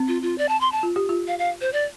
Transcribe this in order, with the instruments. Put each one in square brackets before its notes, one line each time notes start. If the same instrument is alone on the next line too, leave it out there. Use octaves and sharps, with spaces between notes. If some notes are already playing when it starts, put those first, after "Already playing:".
Already playing: [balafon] C4
[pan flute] F4
F4
D5
A5
C6
A5
[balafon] F4
G4
F4
[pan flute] F5
F5
C5
D5